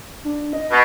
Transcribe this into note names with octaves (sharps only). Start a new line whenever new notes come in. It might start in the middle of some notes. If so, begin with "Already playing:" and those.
D4
D#5
B2